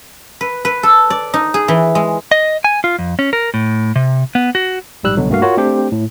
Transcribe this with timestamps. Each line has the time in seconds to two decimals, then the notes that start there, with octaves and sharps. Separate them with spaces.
0.41 B4
0.65 B4
0.83 A4
1.10 D5
1.34 D#4
1.54 G#4
1.68 E3
1.95 G#3
2.31 D#5
2.64 G#5
2.84 F4
2.99 F2
3.19 C#4
3.33 A#4
3.54 A2
3.96 C3
4.35 B3
4.55 F#4
5.03 A#1 G#2 G3 E6 F#6
5.17 C2 B2 D3 F#3
5.30 G2 A3 A#3 F#4 F5
5.42 F4 F#4 A#4 C#5
5.57 A3 C4 D4 G4 C5
5.92 A2